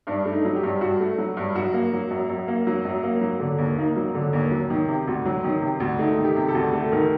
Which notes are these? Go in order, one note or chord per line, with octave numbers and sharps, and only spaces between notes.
G2 D4
A3
D#4
F#3
G4
G2
G2 F#4
A3
F#3
G2
F#2 F#4
A#3
F#3
F#2
F#2
A#3
F#3
F#2
A#3
F#3
D3
D#2
A#3 D#4
F#3
D3
D#2
F#3
D#3
C3
D2
F#3
D#3
C3
D2
A3 D#4
D#3
G4
C3
A4
D2
A3 A4
D#3 A#4